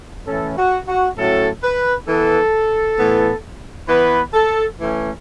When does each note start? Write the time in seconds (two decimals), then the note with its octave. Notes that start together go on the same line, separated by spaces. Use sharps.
0.26 A2 E3 C#4 A4
0.57 F#4
0.87 F#4
1.17 A2 F#3 C#4 A4
1.62 B4
2.07 E3 B3 A4
2.98 A2 E3 B3
3.88 E3 B3 B4
4.33 A4
4.78 E3 A3 C#4